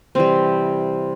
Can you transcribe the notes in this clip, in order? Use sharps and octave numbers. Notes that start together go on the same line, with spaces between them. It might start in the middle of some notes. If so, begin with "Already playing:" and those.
C3 E3 G3 C4